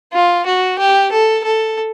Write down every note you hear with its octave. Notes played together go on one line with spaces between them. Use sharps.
F4
F#4
G4
A4
A4